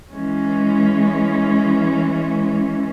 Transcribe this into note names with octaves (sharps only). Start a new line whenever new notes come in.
E3 G#3 C#4